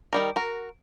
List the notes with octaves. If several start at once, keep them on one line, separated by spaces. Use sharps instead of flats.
D#3 G3 A#4
F#4 A#4